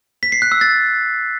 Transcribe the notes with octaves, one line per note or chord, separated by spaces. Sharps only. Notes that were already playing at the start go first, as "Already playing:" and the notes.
B6
C7
F#6
E6
A6